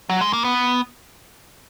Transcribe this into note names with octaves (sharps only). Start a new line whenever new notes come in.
F#3
G#3
A#3
B3